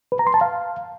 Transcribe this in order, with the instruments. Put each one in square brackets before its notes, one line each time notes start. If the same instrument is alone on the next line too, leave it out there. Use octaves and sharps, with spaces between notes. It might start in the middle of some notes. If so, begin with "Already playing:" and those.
[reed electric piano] B4
A#5
C6
A5
F5